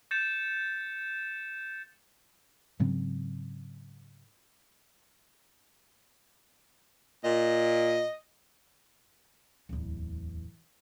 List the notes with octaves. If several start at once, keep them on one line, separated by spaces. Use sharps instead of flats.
G6 A6 C#7 E7
G#2 C#3 F#3 C4
A#2 D#5
D1 E2